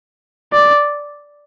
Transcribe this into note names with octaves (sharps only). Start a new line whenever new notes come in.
D5